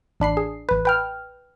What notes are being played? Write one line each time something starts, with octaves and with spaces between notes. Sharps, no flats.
A1 D4 B5 C7
G#4
A1 B4
B4 G5 F6